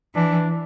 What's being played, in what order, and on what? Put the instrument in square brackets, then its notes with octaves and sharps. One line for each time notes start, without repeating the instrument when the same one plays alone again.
[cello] E3 [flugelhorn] D4